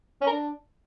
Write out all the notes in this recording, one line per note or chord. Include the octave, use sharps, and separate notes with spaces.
C#4
A#4
D4